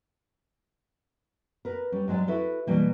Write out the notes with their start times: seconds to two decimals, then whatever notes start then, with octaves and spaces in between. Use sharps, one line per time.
1.65 A#4 B4
1.92 G3 C#4
2.08 G#2 F#3 G#3 D5 G#5
2.27 E4 F#4 A4 B4
2.67 B2 E3 G3 A#3